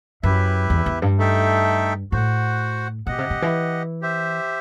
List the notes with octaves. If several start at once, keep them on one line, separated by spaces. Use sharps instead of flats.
F#2 E4 G4 B4 E5
E2
E2
G2
A3 D#4 A4 E5 G5
A2 F#4 C5 F#5
B2 G4 D#5 F#5
C3
C3
E3
G4 C5 E5